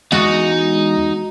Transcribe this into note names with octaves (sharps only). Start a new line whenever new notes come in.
E2 G#3 D#4 F#4